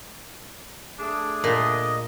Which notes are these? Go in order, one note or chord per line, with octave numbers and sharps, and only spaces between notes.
A3 D4 G#4
A#2 D#5